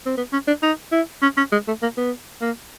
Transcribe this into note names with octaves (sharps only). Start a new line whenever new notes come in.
C4
B3
C#4
D4
D#4
E4
C#4
C#4
G#3
A3
A#3
B3
A#3